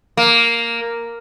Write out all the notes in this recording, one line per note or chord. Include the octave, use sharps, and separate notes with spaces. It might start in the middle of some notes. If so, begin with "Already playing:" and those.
A#3